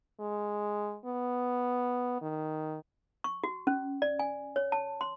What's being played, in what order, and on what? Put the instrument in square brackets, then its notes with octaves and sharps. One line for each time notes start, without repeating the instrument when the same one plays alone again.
[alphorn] G#3
B3
D#3
[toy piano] C#6
F#4
C#4
D5
G#5
C#5
A5
C6